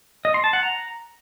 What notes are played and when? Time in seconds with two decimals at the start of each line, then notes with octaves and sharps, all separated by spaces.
0.25 D#5
0.34 C6
0.44 A5
0.53 F#5
0.63 A#5